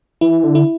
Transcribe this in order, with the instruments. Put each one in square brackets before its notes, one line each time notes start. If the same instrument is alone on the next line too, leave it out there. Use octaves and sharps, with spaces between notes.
[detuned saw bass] E3 [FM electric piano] E4
[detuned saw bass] D3
[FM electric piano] E4